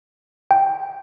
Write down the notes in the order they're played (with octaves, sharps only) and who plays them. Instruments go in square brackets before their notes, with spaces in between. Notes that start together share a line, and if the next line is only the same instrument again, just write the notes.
[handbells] G5